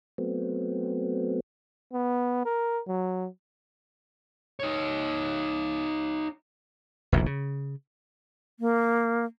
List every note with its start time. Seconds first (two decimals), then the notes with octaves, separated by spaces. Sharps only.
0.18 F#3 A3 B3 C4
1.93 B3
2.46 A#4
2.88 F#3
4.60 D#4 C#5
7.12 F1 A#1 D#2 A2
7.26 C#3
8.60 A#3